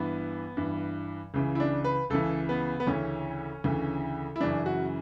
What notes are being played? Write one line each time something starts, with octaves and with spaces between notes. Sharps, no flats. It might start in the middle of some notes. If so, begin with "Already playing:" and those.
Already playing: G2 E3 B3
G2 E3
C#2 C#3 E3
E4
D4
B4
C#2 C#3 E3 A4
B3
B3
D2 C#3 E3 C#4
D2 C#3 E3
E4
F#2 C#3 E3 D4
F#4